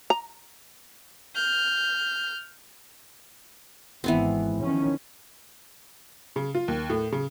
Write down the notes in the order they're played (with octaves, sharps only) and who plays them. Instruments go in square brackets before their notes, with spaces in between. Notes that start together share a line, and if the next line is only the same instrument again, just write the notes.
[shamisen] A#5
[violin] F6 G6
[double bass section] G#1 [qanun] E3 B3 C4
[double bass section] D#3 F3 C#4
[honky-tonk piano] C#3
F4
D#2
A2
C#3